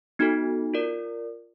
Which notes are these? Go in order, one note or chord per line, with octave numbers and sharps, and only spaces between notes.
B3 D#4 F#4 A4
F4 A#4 D5